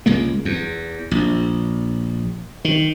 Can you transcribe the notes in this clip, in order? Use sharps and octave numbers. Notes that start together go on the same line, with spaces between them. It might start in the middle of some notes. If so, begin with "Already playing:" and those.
C#2 G#3 A#3
E2
A#1
D#3